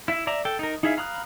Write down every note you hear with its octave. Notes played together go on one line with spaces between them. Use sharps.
E4 E5
D5 E5 A#5
A4 G5
D#4 A#4
D#4 E4 G#4 E5 F5
F5 A#5 B5 D#6 F#6